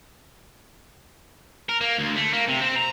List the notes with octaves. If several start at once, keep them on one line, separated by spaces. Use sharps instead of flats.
A#4
A#3
D2
A3
A#3
C3
C4
A#5